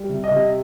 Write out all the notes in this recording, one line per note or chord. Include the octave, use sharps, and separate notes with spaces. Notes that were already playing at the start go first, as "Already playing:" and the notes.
Already playing: G3
C3
D#5
C3